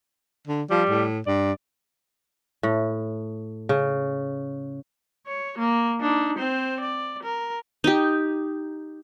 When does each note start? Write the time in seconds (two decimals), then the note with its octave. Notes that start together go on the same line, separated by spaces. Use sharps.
0.47 D3
0.70 F3 G3
0.90 A2
1.27 G2 D5
2.63 A2
3.69 C#3
5.27 C#5
5.58 A#3
6.01 D4 D#4
6.38 C4 C5
6.80 D5
7.23 A#4
7.84 D#4 G4